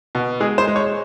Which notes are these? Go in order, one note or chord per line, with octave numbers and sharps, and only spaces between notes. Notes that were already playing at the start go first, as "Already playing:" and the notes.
B2
G#3 G#4
C5
G#3
C#5